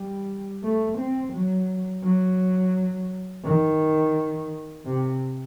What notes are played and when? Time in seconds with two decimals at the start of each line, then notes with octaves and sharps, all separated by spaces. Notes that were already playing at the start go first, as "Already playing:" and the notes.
Already playing: G3
0.64 A3
0.99 C4
1.34 F#3
2.04 F#3
3.45 D#3
4.86 C3